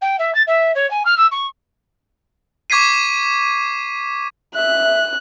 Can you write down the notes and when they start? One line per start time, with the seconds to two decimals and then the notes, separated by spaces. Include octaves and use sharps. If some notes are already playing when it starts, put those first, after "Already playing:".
0.01 G5
0.19 E5
0.34 A6
0.47 E5
0.75 C#5
0.90 G#5
1.05 F6
1.17 E6
1.31 C#6
2.70 C#6 D6 G#6 B6 C7 D#7
4.55 E5 F#6